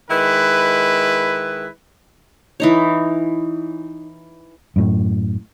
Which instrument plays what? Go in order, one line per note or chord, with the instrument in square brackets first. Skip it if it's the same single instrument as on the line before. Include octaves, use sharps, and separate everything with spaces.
[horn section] D#3 G#3 E4 B4
[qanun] E3 D#4 C#5
[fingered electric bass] F#2 A2